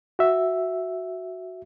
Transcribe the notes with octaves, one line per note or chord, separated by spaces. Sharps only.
F#4 E5